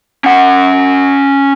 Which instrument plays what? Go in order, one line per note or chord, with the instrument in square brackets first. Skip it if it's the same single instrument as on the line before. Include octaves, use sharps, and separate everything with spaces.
[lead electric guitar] C#4 F#5